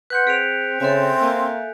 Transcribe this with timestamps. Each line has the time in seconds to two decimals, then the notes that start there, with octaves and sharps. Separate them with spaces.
0.10 B4 F#5 C6 F#6 G6 C#7
0.27 C4 G#4 B6 D7 F7
0.80 C#3 C4 A4 E5 G#5
1.22 A#3